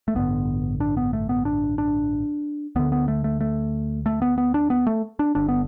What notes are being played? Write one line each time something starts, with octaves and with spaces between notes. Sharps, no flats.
A3
A1 G2 D3 B3
D4
B3
A3
B3
D4
D4
D2 D3 B3
B3
A3
A3
A3
A3
B3
B3
D4
B3
A3
D4
G1 G2 D3 D4
B3